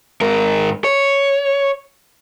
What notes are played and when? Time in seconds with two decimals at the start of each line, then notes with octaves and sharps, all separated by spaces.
0.21 G#2 A#4
0.84 C#5